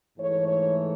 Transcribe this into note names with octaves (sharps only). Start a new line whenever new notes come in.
G#2 E3 A3 C#5
C#5